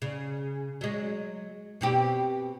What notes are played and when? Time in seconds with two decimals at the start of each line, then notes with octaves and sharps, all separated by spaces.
0.02 C#3
0.81 F#3 G#3
1.81 B2 C4 G4